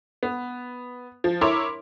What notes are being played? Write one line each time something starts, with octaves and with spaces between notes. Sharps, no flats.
B3
F3
E4 A#4 C#5 C6 D6